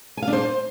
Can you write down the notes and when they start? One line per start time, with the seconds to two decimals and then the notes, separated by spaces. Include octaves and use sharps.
0.17 G#5
0.22 F5
0.28 D4
0.33 C5